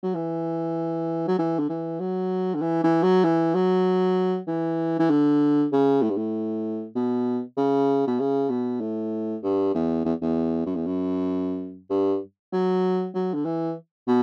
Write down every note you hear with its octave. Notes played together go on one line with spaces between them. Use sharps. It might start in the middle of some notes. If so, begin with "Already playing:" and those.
F#3
E3
F#3
E3
D3
E3
F#3
D3
E3
E3
F#3
E3
F#3
E3
E3
D3
C#3
A2
G2
A2
B2
C#3
B2
C#3
B2
A2
G2
E2
E2
E2
F#2
E2
F#2
G2
F#3
F#3
D3
E3
B2